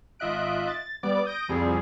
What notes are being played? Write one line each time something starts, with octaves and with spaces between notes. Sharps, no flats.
G#1 F4 D#5 E5 F#6 D7
A6
G3 B3 D5 D6
D#6 G6 A#6 D7
C2 F2 F3 G3 C4 G#4